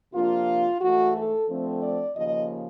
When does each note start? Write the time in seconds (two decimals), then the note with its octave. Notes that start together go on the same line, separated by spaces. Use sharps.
0.13 C3 F3 A#3 D4 F4
0.81 G#2 E3 A3 F#4
1.15 A4
1.48 D3 F3 A3 C4
1.82 D5
2.16 D#2 C#3 F3 A#3 D#5